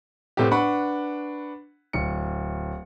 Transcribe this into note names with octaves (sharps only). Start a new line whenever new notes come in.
A2 A3 B3 C4 G4
D4 B4 F#5 B5 C#6
D1 C#7